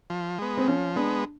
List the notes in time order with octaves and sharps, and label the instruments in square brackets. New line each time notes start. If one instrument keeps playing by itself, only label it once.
[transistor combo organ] F3
G#3 B3
[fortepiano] C4
[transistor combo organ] F3 [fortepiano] C#4
[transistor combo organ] G#3 B3 [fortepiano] D4